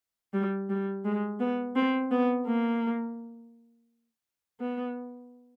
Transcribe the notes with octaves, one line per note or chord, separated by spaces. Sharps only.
G3
G3
G#3
B3
C4
B3
A#3
B3